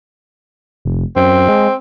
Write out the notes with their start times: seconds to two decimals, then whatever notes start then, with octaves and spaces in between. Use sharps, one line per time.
0.85 F1
1.16 F#2 C4
1.48 G#3